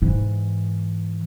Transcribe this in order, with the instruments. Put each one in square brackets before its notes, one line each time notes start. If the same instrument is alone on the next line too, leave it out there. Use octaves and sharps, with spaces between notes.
[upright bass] G#2 E3